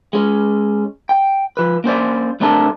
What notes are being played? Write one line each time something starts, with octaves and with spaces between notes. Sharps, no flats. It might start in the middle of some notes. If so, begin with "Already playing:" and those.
G#3 C#4
G5
F3 B4
A#3 C#4 C5 D5
C2 A3 C4 D4 A#4 A5